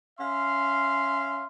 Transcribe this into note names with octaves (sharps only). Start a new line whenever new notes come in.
C#4 E5 F5 C6